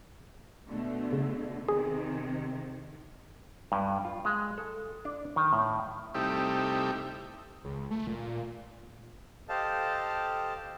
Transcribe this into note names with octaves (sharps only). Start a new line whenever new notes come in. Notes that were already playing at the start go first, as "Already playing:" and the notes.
B2 D3 A3
C#3
C3 D#3 G#4
G2
F4
G#3
A4
D4
D#3
A2
C3 G3 A3 D#4 E4 G4
C#2
A3
A#2
G4 A4 C5 D#5 F5 A5